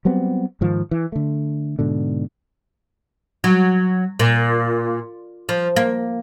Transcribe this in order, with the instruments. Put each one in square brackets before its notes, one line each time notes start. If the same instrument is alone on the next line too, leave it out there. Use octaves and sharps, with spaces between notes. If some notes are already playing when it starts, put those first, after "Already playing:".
[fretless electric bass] F#3 G3 B3 C4
G#2 D#3 F3
E3
D3 A3
G#2 B2 D3
[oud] F#3
A#2
F3
A#3